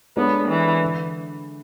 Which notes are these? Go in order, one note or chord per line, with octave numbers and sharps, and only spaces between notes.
G#3 B3 D4 A4 C#5
E3
D3